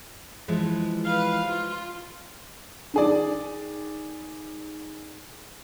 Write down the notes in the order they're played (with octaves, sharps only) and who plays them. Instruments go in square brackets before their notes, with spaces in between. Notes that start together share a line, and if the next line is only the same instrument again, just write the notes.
[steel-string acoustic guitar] E3 F3 G#3
[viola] B4 F5
F4
[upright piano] D#3 G#4 D5